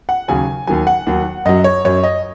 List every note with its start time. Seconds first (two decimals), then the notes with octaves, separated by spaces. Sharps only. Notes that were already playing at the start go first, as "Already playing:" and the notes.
0.09 F#5
0.28 D#2 C#3 F#3 G#5
0.67 D#2 D#3 F#3 G#5
0.87 F#5
1.07 D#2 D#3 F#3
1.45 F#2 F#3 D#5
1.64 C#5
1.85 F#2 F#3 C#5
2.04 D#5